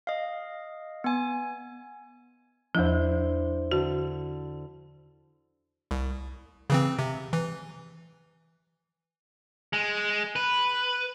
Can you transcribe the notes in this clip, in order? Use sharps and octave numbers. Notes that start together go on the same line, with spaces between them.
D#5 F5
B3 G#5
E2 F3 D4 E4 C5
D3 F#4
C2
C#3 E3 C4
C3
E3
G#3
B4